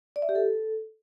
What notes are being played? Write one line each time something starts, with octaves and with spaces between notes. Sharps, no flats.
D5
E5
G4
A4